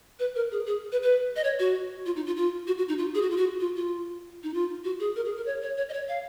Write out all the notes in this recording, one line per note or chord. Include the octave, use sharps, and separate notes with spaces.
B4
A#4
G#4
G#4
B4
B4
D#5
C#5
F#4
F4
D#4
F4
F4
F#4
F#4
D#4
F4
G#4
F#4
F4
F#4
F4
F4
D#4
F4
F#4
G#4
A#4
G#4
A#4
C#5
C#5
C#5
D#5
C#5
F5